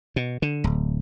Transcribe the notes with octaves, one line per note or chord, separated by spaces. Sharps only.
B2
D3
D1